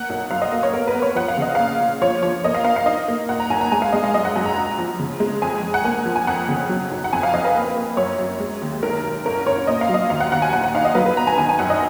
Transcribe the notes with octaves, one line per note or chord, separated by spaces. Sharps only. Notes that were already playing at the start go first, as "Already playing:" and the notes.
Already playing: A#3 F#5
B1
F#2 F5
D#5
A#3
C#5
B3 A#4
B4
B3
C#5
F3 F#5
F5
C#3 D#5
A#2 F5
A#2
F3 C#5
F3 C#5
A#3 D#5
F5
A#3 F5
F5
D#4 D#5
A#3
A#2 F#5
A#5
B1 G#5
A#5
G#3 G#5
F5
G#3 D#5
F5
F#2 D#5
F#5
F#2 G#5
A#5
A#1 A#5
F3
C#3
G#3
F2 G#5
F2
F#5
A#3 G#5
F3
G#5
F2 F#5
C#3
F#3
B1
F#5
F2 G#5
F5
F2 D#5
B4
A#3
A#3
F#2 C#5
F#2
G#3
D#2
B1 A#4
B1
F#1 A#4
F#1 C#5
A#2 D#5
F5
F#3
D#5
D#2 F5
F#5
D#2 F#5
G#5
A#2 F#5
F#5
D#4 F5
D#5
F#3 B4
B4
B3 A#5
G#5
D#3 G#5
G#5
F#2 F#5
D#5